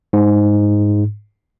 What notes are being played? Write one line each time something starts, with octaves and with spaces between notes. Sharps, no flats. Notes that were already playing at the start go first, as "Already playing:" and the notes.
G#2